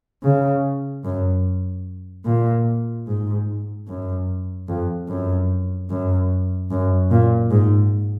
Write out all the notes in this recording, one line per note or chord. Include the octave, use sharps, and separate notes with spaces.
C#3
F#2
A#2
G#2
F#2
F2
F#2
F#2
F#2
A#2
G#2